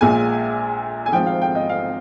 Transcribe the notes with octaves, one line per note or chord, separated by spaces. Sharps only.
A#1 A#2 G#3 G#5
G#5
G#1 G#2 F3 G5
F5
G5
D#5
F5